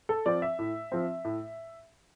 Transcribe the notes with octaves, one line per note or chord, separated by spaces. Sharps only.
A4
F3 C4 D5
E5
A2
F3 C4
A2